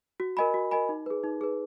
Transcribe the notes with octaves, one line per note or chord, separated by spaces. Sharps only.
F#4
A#4 D#5 G#5 B5
F#4
A#4 D#5 G#5 B5
D#4
G#4 B4
D#4
G#4 B4